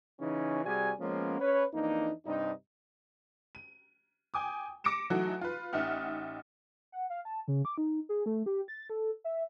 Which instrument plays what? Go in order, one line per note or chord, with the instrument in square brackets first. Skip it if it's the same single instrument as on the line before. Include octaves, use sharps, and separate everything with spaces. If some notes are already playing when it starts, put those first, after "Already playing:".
[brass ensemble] C#3 E3 C#4 D#4
C3 G3 F#4 G#4 D5 G#5
F3 G#3 A#3 B3 C#4
C#4 B4 C#5
F2 E3 A#3 D4 D#4
G2 C3 D4 D#4
[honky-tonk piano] D#7
G5 G#5 D6 D#6
D6 A#6 C#7 D7 E7
E3 F#3 A3 D#4 F#4
F4 B4
A1 D#4 E5 F#5 F6
[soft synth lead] F#5
F5
A5
C#3
D6
D#4
G#4
A3
G4
A6
A4
E5